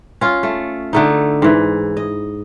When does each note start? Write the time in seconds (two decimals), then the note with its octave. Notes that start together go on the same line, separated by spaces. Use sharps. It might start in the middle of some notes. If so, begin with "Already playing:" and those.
0.21 C#4 F4
0.43 A3
0.93 D3 A3 D#4
1.42 G#2 E3
1.97 D#5